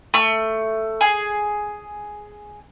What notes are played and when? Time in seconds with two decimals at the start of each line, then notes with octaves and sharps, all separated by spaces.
0.14 A3
1.01 G#4